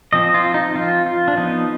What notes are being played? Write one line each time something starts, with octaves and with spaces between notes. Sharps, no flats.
F3 C4 D#5
F4
D#4
F3 C4 F4
F4
D4
F3 B3 D#4